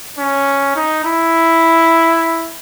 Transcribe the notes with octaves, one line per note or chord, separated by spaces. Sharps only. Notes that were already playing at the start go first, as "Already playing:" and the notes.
C#4
D#4
E4